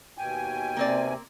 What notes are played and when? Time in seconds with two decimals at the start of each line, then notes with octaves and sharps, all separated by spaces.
0.18 D#2 B2 G5 G#5
0.77 C3 A#3 C4 D5